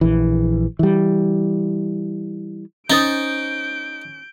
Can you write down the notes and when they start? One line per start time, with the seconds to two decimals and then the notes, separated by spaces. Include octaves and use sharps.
0.01 A#1 E3
0.79 E3 G3
2.90 C#4 D#4 C5 D#6 G6 A6 D7 G7